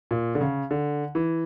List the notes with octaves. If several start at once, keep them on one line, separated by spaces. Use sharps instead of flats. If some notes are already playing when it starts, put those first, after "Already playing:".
A#2
D3
C#3
D3
E3